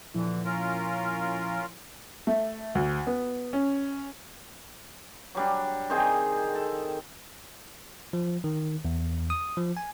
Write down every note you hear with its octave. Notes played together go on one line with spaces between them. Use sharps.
A#2 D3 E3 F3 E4
C#4 F4 A#4
A3
D2
B3
C#4
F#3 G3 D4
D#3 C4 D#4 G#4
A4
F3
D#3
E2
D#6
F3
G#5